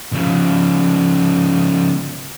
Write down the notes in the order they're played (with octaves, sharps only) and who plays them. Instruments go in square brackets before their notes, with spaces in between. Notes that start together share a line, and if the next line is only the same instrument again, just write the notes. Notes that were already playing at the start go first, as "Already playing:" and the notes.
[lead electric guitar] C#3 F3